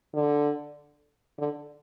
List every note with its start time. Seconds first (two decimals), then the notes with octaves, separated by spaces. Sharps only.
0.15 D3
1.38 D3